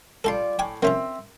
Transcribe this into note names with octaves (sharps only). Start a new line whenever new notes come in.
G3 F4 A4 D5 A5 C6
A2 G5 G#5 D6
A#3 C4 C#4 F4 E5